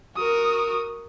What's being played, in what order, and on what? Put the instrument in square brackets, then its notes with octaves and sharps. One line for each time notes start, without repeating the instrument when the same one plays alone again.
[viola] F#4 A#4 [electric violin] D#6